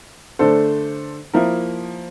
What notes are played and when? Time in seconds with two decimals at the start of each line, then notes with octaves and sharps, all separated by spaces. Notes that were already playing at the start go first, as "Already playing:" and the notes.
0.39 D3 A3 D4 A4 C5
1.34 F3 A#3 E4 A#4